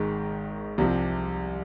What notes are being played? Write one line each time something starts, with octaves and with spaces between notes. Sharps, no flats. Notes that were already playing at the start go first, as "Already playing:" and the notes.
Already playing: G#1 G#2 D#3 G#3
C2 C3 F3